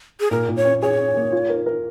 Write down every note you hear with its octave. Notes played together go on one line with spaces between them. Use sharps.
G#4
A#2 A#4
A#2
C#5
C#4
G#4 C#5
C#4
A#3
F4
A#4
A#4